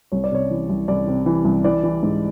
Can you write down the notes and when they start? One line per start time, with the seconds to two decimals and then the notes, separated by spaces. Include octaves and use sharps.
0.12 C2 C#5
0.24 D5
0.32 C3 C#5
0.51 E3
0.69 C2
0.88 C2 D5
1.07 C3
1.26 E3
1.45 C2
1.64 E3 D5
1.83 E3
2.03 G#2